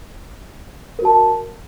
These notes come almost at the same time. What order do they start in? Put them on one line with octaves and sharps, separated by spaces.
A#4 F#4 A5